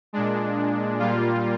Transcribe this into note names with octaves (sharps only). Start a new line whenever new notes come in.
A#2 G#3 D4
A#2 G3 A#3 F4